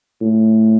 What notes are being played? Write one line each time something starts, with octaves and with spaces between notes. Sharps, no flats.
A2